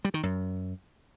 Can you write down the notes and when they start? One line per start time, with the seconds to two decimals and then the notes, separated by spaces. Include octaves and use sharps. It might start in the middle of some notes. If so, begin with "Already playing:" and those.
0.05 G3
0.14 D#3
0.23 F#2